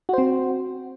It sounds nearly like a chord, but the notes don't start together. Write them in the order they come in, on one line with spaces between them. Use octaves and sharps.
F#4 C5 C4